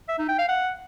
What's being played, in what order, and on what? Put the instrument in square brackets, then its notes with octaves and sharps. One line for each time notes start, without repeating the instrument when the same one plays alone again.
[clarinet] E5
D#4
G5
F5
F#5